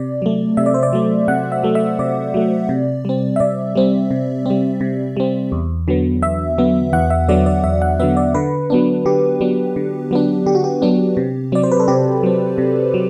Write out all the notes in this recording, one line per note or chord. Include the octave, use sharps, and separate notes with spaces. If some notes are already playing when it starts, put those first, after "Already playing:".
Already playing: C3 D5
F#3 A3
C3 E5
D5
C5
D5
F#3 A3
C3 F#5
E5
F#3 A3
E5
C3 D5
F#3 A3
C3
G3 C4
E5
C3 D5
G3 C4
C3
G3 C4
C3
G3 C4
E2
D3 F#3 B3
E2 E5
D3 F#3 B3
E2 F#5
E5
D3 F#3 B3 D5
D5
E2 E5
F#5
D3 F#3 B3 E5
D5
D3 B4
F#3 B3 D4
D3 G4
F#3 B3 D4
D3
F#3 B3 D4
D3 G4
F#4
G4
F#3 B3 D4
C3
F#3 C4 D5
C5
B4
A4
C3 G4
F#3 C4
C3
F#3